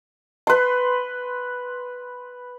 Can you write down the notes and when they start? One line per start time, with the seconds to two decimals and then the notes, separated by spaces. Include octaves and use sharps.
0.47 B4 C6